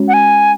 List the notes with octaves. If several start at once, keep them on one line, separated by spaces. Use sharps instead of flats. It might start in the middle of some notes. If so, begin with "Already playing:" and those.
Already playing: G#3 C#4 F#4 C#5
F#5
G#5